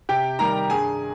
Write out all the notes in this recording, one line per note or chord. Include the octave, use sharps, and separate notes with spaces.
C3 G4 G5
D#3 G3 A#4 A#5
G2 G#4 G#5